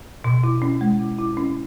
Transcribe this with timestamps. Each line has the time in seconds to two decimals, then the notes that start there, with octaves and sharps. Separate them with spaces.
0.24 B2
0.44 E4
0.62 C#4
0.81 G#3
0.99 E4
1.19 E4
1.37 C#4